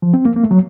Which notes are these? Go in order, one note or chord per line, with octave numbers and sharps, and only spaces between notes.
F3
C4
A#3
A#3
A3
F#3